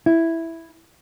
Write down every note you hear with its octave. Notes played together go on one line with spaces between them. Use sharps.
E4